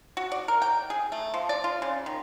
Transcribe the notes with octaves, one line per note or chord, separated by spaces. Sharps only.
F#4
D5
A#4
G5
G#4
A3
F3
D5
F4
C#3
D#3